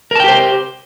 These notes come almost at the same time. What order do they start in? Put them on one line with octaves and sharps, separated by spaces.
A#4 A5 G5 G4 C5